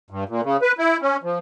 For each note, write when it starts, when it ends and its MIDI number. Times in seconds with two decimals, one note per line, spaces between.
0.11 0.24 43
0.29 0.41 46
0.44 0.57 49
0.62 0.72 71
0.78 0.97 64
1.02 1.17 61
1.23 1.39 53